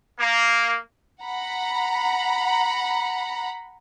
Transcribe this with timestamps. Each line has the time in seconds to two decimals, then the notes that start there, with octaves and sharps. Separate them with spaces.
0.20 A#3
1.22 F#5 A#5 B5